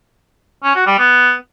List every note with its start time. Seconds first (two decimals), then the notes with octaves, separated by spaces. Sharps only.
0.64 C#4
0.75 F#4
0.87 G3
0.99 B3